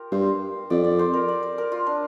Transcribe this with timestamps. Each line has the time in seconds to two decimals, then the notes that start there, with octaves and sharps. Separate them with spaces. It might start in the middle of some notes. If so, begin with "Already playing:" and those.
Already playing: F4 G4 A#4
0.12 G2 C5
0.70 F2 D5
0.84 D5
0.99 C5
1.13 A#4
1.28 D5
1.43 C5
1.58 A#4
1.72 F4
1.87 D4